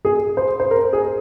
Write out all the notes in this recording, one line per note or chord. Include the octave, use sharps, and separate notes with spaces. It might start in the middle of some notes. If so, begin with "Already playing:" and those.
G#4
C5
C5
A#4
G#4